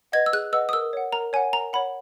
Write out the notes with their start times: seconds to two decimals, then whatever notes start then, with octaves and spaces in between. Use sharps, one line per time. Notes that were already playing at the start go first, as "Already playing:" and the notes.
0.12 B4 D#5 F#5 G#6
0.26 E6
0.33 G#4 F#6
0.52 B4 D#5 F#5 E6
0.69 D#6
0.73 A#4 E6
0.93 C#5 F#5
1.13 A#4 A#5
1.33 C#5 F#5 G#5
1.53 A#4 A#5
1.73 C#5 F#5 B5